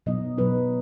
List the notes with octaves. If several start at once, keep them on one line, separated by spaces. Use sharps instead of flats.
B2 F#3 B3 D#4 D#5
B2 F#3 B3 D#4 B4